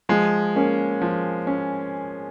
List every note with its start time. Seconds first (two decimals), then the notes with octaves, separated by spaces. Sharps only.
0.09 F3 G#3
0.55 A#3 C#4
1.02 F3
1.47 C#4